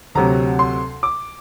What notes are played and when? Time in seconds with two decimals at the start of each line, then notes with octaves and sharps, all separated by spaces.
0.15 D2 C3 F#3 A#5
0.59 C6
1.03 D6